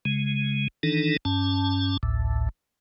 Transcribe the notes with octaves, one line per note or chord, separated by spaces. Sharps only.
C#3 G#3
D#3 E3 D4 D#4 A4
G2 C#4 A5
A1 D2 A2